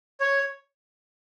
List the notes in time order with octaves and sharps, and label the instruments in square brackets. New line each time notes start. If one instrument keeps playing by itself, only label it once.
[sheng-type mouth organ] C#5